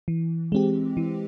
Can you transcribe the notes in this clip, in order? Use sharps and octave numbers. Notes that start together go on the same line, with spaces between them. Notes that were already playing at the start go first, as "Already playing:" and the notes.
E3
G#3 C4 G4
E3